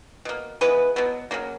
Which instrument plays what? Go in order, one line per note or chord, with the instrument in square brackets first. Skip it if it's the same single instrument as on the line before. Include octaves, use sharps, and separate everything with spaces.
[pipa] B2 A#3
E3 G#3 B3 B4
B2 F#3 B3
C#3 F#3 A#3